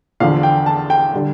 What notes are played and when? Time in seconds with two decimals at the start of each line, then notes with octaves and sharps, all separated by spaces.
0.20 E2 D3 F3 F5
0.43 G5
0.66 A5
0.90 G5
1.13 D3 G3